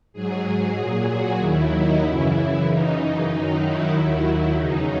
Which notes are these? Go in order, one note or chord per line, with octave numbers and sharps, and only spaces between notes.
G#2 F#3 G#4
G#4
A#2 F#3
F#4
D#2 D#3 F#3 E4
D#4
F#2 C#3 E3 E4
F#2 C#3 E3 D#4
F#2 D#3 F#3 D#4
E4
D#2 D#3 F#3
E2 C#3 F#3 D#4